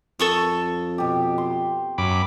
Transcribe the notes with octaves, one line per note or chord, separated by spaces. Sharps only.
F2 A4 C#6 D#6
B2 G4
C6
F#2 B5 D6